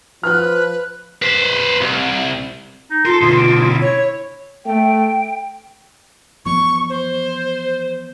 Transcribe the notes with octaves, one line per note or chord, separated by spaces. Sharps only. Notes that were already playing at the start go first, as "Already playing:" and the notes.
F3 B4 F6 F#6
B4 C5
C2
D#4
F4 A4 A#4 C6
B2 D3
D6
E4
C#5
A3 G5
E3 F3 B3 C#6
C5